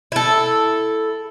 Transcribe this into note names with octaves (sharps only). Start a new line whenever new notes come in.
E4 A4